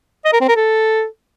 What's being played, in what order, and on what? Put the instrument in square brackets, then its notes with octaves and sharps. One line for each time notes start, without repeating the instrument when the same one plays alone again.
[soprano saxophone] D#5
A#4
C4
A#4
A4